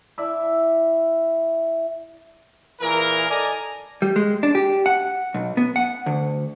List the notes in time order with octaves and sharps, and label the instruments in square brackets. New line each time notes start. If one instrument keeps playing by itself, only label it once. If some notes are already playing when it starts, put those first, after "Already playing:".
[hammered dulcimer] E4 D5 E5
[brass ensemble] A#2 E3 G#4 A#4
A4 D5 D#5 G#5 A#5
[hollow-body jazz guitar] G3
G#3
D4
G4
F#5
B1
B3
F#5
D2